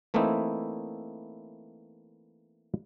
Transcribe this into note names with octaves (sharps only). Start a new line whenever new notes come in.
E3 A3 A#3 C4 D#4 E4